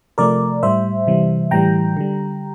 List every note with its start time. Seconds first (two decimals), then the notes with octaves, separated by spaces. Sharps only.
0.18 C3 F3 A3 A#4 D5
0.63 A2 G3 C5 E5
1.07 C3 E3 G3
1.51 A2 E3 G3 G5 A#5
1.97 D3 G3